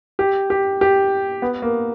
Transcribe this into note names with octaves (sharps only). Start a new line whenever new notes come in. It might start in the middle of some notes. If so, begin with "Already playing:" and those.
G4
G4
G4
B3
A#3